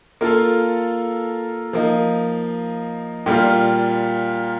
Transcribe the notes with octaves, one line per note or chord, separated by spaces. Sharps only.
A#3 F4 A4
F3 A#3 D#4
A#2 G3 A#3 F4